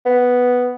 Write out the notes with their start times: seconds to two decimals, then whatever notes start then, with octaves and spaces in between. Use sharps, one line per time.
0.05 B3